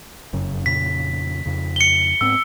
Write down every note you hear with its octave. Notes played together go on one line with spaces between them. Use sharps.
F1 F#2 C#3
F2 A#2 C#3 B6
F2 C#3
C#7 G7
G#2 B3 C4 E6